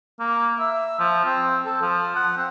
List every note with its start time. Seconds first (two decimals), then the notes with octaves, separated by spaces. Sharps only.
0.20 A#3
0.59 E5
0.99 F3
1.24 C4
1.65 A4
1.81 F3
2.16 F#5
2.37 C4